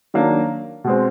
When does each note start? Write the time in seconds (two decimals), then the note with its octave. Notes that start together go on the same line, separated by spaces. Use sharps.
0.14 D#3 F#3 A#3 D4
0.84 B2 G#3 C4